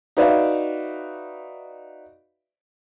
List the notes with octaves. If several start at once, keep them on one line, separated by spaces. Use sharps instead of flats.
D#4 F#4 B4 D5 E5 F5